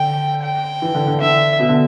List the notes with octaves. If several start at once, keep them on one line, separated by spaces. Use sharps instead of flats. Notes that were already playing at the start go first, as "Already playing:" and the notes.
Already playing: D3 G5
G5
E3
D3
D3
D3 E5
B2
D3